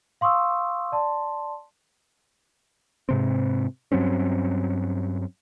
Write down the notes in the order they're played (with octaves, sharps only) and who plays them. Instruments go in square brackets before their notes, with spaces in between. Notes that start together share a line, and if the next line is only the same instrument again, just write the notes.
[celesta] F5 C6 C#6 D#6 E6
D5 A5 C6
[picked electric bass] G#2 C3 C4
G2 F#3 C4 C#4